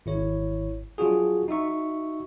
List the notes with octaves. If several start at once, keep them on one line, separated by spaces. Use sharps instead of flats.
G#1 E4 C#5
F#3 D4 F4 F#4 G#4
D#4 F#4 E5 C#6